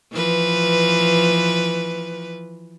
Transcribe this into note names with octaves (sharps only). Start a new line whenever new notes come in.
E3 F3 B4